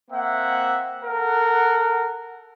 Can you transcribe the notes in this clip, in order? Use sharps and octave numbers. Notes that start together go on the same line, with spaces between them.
A#3 C4 E5 F#5
A4 A#4 F#5